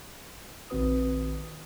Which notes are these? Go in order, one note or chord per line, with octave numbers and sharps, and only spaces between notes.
A#1 D#3 C4 F#4 B4 D#6